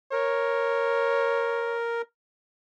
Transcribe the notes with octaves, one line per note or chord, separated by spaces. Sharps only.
A#4 C#5